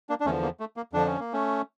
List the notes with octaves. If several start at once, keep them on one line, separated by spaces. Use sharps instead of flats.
A#3 D4
D4
E2 D3 F3 A3 C#4
A#3
A3
A#3
F2 D3 F3 D4
C#4
A#3
A3 C#4